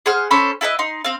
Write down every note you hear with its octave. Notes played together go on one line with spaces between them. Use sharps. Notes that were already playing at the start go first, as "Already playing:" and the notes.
G#4 C5 F#5 F6
C#4 A4 C5 B5
E4 A4 B4 D#5
D#4 C6
C4 F5